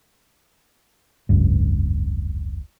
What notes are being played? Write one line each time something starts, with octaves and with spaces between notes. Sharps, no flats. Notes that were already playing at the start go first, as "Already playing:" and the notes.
F1 C#2 G2